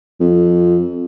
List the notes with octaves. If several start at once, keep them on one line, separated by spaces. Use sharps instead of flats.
F2